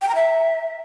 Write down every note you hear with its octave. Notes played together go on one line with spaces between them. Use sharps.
G5
A#5
E5